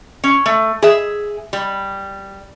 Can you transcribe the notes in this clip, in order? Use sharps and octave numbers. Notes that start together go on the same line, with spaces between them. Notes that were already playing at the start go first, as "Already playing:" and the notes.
C#4
A3
G#4 E5
G3